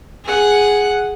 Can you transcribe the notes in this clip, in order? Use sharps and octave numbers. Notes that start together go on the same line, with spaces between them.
G#4 F#5